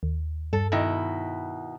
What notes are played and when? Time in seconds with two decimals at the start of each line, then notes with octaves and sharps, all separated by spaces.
0.03 D#2
0.53 G2 A4
0.72 B2 D#3 E4